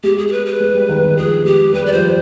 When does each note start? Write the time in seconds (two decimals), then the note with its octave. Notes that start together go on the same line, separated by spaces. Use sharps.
0.03 G#3 G4
0.18 G#4
0.28 G#4
0.32 B4
0.46 B4
0.60 G#3
0.75 G3
0.89 D#3
1.03 D#3
1.17 F3 G#4
1.45 G#3 G4
1.73 G3 B4
1.86 D5
1.93 F3 C5